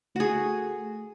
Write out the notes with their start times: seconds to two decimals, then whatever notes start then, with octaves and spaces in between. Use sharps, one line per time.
0.16 A3 F#4 G#4